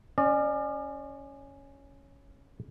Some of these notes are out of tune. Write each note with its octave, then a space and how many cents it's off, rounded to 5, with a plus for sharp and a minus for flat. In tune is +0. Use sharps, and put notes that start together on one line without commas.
C#4 +0 D5 +40